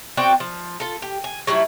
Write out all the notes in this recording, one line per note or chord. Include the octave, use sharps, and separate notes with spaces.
C4 F#4 D5 G5
F3
F4 A4
G4
G#5
F#3 G3 A3 E4